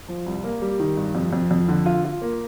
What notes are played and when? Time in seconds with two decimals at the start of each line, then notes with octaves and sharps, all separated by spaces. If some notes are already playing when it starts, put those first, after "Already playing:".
0.08 F3
0.26 C2
0.44 A#3
0.62 G3
0.80 D#3
0.97 G2
1.15 F2
1.33 F2
1.51 F2
1.68 D3
1.86 F4
2.05 F4
2.22 A#3